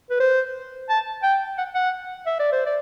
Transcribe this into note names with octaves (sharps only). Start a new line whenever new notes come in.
B4
C5
A5
G5
F#5
F#5
E5
D5
C5
D5